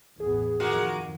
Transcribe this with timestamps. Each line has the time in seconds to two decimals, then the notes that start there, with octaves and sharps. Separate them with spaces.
0.20 A1 E2 B3 G#4
0.60 F2 D#3 G#3 A#3 F#4